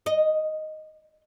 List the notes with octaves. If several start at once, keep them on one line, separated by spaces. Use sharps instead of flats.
D#5